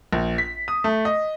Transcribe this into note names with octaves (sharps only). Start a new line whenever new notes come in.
A#1
B6
D#6
A3
D#5